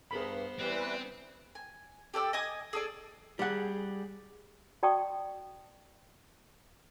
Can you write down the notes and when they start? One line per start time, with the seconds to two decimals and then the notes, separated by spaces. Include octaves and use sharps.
0.11 G2 B3 G#4 A#4 C5 B5
0.59 E3 G3 C4 B4
1.55 G#5
2.14 G4 A4 D5 E6
2.33 D#5 G#5 D#6
2.73 G#4 A4 D5
3.39 G3 G#4 F#5
4.83 F#4 D5 G5 A5 C#6 D#6